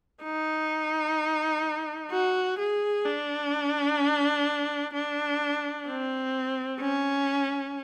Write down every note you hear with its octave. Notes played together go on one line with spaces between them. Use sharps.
D#4
F#4
G#4
D4
D4
C4
C#4